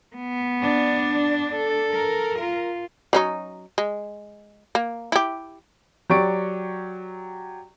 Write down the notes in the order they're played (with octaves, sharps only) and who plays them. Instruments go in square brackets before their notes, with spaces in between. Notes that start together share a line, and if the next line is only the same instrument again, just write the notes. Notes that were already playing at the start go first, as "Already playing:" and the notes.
[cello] B3
[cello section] D4
[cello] A4
[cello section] A#4
[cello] F4
[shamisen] F#3 C#4 D#4
G#3
A#3
E4 G4
[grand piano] F#3 G4 D5 C#6 D7